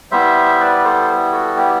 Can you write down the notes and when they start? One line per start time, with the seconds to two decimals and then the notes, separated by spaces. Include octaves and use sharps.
0.11 G3 B3 E4 C5 E5
0.60 B4 D5
0.84 A4 C5
1.32 F#4 A4
1.57 G4